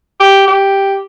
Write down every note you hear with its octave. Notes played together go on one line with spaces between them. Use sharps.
G4
G4